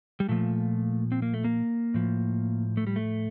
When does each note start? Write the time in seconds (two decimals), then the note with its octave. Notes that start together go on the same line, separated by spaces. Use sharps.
0.20 G3
0.28 A#2 F3 A3
1.12 C4
1.22 A#3
1.34 A3
1.44 A#3
1.94 A2 F3
2.77 A3
2.87 G3
2.96 A3